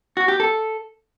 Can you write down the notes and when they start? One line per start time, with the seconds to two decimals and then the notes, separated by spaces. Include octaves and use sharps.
0.17 F#4
0.28 G4
0.40 A4